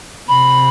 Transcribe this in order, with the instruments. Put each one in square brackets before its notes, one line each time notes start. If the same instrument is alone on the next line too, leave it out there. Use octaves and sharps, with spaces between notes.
[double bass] C3 [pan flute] B5